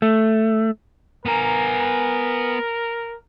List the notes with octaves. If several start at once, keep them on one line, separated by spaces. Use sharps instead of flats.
A3
B3 A#4 G#5 A#5